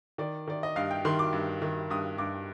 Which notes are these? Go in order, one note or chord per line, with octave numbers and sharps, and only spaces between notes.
D#3 D5
D#3 D5
D#5
G2 F5
G5
D#3 C6
D6
G2
D#3
G2 D#6
G2 D6